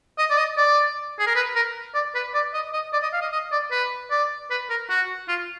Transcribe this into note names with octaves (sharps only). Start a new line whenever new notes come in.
D#5
D5
D#5
D5
G#4
A#4
B4
A#4
D5
B4
D5
D#5
D#5
D5
D#5
F5
D#5
D#5
D5
B4
D5
B4
A#4
F#4
F4